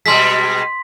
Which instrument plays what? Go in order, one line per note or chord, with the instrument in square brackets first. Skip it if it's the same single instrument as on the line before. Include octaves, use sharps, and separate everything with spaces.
[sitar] B2 G3 G#3 [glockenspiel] C6 B6